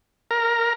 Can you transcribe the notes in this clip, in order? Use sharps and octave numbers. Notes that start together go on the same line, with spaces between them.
A#4